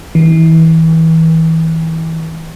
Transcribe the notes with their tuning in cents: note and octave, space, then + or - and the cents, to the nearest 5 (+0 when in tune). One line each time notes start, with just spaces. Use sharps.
E3 -30